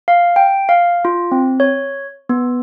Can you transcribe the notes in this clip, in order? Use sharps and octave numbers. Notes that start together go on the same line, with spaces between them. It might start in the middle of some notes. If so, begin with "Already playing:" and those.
F5
G5
F5
F4
C4
C#5
B3